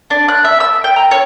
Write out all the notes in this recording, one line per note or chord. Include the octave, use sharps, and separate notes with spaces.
D4
F#6
E5
E6
G5
A#5
C#5